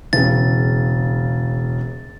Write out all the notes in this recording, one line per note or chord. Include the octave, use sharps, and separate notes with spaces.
E1 C#3 A6